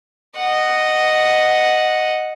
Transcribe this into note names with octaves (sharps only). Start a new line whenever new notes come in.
D#5 F#5